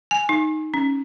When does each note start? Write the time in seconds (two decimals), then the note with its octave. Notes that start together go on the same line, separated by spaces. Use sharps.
0.11 G#5
0.29 D#4
0.74 C#4